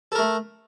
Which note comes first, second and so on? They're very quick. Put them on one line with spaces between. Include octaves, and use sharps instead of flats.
A4 A#4 A3